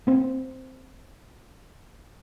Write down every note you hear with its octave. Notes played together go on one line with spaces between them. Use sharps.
A#3 C4